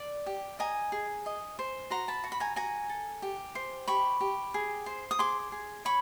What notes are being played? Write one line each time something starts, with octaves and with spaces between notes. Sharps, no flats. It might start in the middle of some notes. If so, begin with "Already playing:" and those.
Already playing: D5
G4
D#5 G#5 A#5
G#4
D#5
C5
F#4 A#5 C6
A5 B5
F#4
B5
G#5 A#5
F#4 G#5 A#5
A4
G4
C5
G4 B5 C#6
G4
G#4
C5
D#6
G#4 C6 D6
G#4
C#5 B5 C#6